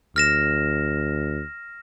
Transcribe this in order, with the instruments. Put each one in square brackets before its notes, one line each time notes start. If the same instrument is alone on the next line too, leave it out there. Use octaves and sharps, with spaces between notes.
[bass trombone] D2 [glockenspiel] F6 A#6 E7